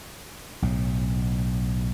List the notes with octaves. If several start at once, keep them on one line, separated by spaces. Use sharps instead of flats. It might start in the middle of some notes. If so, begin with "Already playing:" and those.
B1 A2